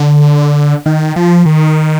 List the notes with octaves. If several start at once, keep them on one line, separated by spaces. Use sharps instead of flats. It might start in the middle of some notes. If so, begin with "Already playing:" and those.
Already playing: D3
D#3
F3
D#3